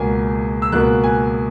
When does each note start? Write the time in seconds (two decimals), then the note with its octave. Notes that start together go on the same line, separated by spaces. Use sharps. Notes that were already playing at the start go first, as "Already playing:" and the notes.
Already playing: C#2 B2 A#3 G#5
0.62 E6
0.72 C#2 B2 A#3 F#6
1.04 G#5